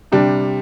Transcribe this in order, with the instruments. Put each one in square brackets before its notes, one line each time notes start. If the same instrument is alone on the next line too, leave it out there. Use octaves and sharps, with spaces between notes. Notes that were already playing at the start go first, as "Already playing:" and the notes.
[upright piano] C3 G3 D4